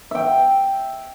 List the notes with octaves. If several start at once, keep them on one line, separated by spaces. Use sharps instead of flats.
E5 G5